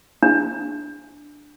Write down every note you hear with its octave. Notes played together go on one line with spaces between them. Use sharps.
D4